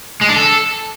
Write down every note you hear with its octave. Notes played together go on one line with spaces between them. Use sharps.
G#3
D4
A4